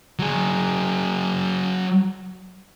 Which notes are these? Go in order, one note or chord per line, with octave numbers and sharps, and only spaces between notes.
F#3 G#4